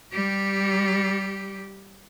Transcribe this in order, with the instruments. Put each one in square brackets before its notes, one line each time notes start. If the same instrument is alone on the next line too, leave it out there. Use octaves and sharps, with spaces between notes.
[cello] G3 G4